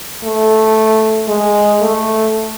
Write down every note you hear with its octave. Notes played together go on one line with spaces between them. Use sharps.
A3
G#3
A3